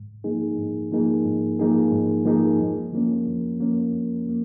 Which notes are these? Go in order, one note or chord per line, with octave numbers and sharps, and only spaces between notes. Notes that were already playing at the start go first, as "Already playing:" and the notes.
Already playing: G#2
F3 A#3 D#4 G#4
G#2
F3 A#3 D#4 G#4
G#2
F3 A#3 D#4 G#4
G#2
F3 A#3 D#4 G#4
F2
F3 A#3 C#4
F2
F3 A#3 C#4
F2
F3 A#3